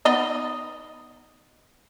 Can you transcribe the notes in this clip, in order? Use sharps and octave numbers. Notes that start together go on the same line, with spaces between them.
B3 D#4 D#5